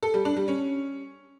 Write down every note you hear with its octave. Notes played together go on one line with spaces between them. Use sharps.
A4
G3
D4
G3
C#4